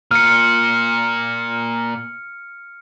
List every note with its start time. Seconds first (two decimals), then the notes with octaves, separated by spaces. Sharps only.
0.11 A#2 F6 C#7